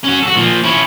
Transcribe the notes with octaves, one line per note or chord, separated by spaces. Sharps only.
C#4 F#4
F#4 A4
A#2 F3
C#4 E4